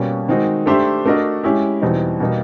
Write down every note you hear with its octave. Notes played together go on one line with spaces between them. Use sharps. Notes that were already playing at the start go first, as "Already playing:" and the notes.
Already playing: B2 G3 A#3 C#4
D#3 G#3 C4 D#4 F#4
A3 D4 G4 C5 E5
A3 D4 F#4 A#4 D#5
G#3 C#4 E4 G4
E2 B2 G3 C4 D#4
B2 G3 A#3 D#4